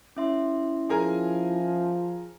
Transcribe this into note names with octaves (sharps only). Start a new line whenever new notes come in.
C#4 E4 E5 C6
F3 G#4 A#4 G#5